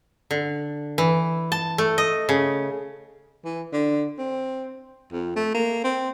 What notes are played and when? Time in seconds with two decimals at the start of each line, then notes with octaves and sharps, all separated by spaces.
0.31 D3
0.98 E3
1.52 A5
1.78 A3
1.98 D#5
2.29 C#3
3.45 E3
3.73 D3
4.18 C4
5.12 F2
5.36 A3
5.54 A#3
5.84 C4